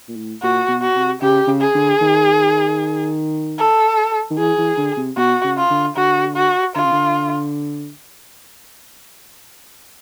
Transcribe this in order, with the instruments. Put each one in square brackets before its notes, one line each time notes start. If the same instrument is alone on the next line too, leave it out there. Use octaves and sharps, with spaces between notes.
[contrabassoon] A#2
A2
[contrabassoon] A#2 [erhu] F#4
[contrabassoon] B2
[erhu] F#4
[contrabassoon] C3
[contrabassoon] C#3 [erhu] G4
[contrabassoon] C#3
[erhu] G#4
[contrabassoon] D3
D#3
[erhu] A4
[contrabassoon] D#3
[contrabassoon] E3 [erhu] G#4
[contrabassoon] E3
D3
C3
[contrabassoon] B2 [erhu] F#4
[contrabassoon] C#3
[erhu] F4
[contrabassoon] D3
[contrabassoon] D3 [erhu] F#4
[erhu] F#4
[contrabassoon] D3 [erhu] F4
[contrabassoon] C#3
D3